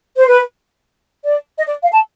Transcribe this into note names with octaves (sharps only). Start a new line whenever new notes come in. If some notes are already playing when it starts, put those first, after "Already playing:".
C5
B4
D5
D#5
D5
F5
A5